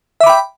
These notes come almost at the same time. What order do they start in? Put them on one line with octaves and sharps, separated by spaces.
E5 D6 B5 G5